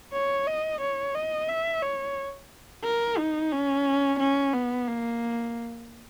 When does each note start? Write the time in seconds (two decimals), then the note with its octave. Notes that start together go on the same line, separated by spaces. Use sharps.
0.13 C#5
0.47 D#5
0.81 C#5
1.15 D#5
1.49 E5
1.83 C#5
2.84 A#4
3.18 D#4
3.52 C#4
4.20 C#4
4.53 B3
4.87 A#3